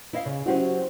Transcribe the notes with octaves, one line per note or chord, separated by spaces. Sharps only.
E4 D#5 F5
C#3
F#3 C4 C#4 E4 F#4 G4